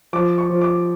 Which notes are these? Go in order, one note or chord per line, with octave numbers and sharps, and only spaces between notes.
F3 D6
C#6
F3
D6